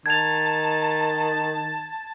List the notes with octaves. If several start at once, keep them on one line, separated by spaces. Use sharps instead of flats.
D#3 A5 G#6 F7